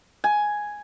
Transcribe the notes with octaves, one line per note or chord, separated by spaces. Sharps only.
G#5